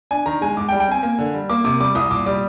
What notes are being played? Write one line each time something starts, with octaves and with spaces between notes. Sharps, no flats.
D4 G#5
D#3 A#5
G#3 G#5
G#2 D6
G5
G3
G5
C4 G#5
A#3
D3
G3
A#3 D6
C3 D6
G3 D6
C2 D#6
A#2 D6
G3 D6